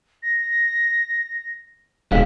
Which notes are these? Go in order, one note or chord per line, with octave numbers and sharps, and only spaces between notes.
A#6
D1 B2 G#3 F5 B6